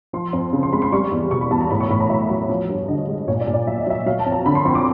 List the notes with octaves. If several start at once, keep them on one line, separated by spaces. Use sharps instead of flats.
F3 C6
F2
C#3
C6
G#3 B5
C6
G3 C#6
E2
B2 C#6
B5
E2 A5
A#5
A2 B5
C#6
A2 B5
A#5
F#3 E5
F#3
F3
G2
D3 D#5
G#3
A#2 C#5
D5
A#2
D5
F#3 E5
D#5
F#3 E5
F#3 F5
A5
F2
A#5
D3 B5
C6
F2 C#6
D6